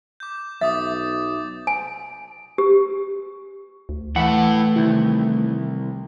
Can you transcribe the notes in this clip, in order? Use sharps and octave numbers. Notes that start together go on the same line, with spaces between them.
D6 G6
B1 E5 D6 D#6 A6
G#5
G4
D2
E3 A3 E4 A4 B4 F#5
C2 D#3 E4